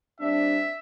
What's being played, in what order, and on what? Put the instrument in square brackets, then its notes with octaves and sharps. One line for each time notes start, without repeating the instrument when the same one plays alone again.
[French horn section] G3 C4 D4 [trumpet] E5